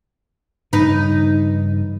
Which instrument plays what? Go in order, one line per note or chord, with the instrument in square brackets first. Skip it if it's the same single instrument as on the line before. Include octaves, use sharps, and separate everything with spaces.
[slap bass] G2 C#3 E3 [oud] D#4 B4